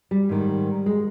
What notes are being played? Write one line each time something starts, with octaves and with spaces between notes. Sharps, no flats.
G3
G#2 D#3
G#3